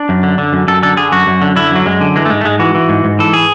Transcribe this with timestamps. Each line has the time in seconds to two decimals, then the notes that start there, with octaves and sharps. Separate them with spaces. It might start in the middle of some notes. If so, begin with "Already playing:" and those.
Already playing: D4
0.09 F#2
0.23 D3
0.38 D3
0.53 F#2
0.68 F#2 A4
0.83 D3 A4
0.97 D3 G#4
1.12 F#2 F#4
1.27 F#2
1.42 D3
1.56 D3 E4
1.71 F#2 F#3
1.86 F#2 G#3
2.01 D3
2.16 E3 G#3
2.26 A3
2.30 G#2 G#3
2.41 A3
2.45 G#2 G#3
2.59 E3 F#4
2.74 E3
2.89 G#2
3.04 G#2
3.19 E3 A4
3.33 G#4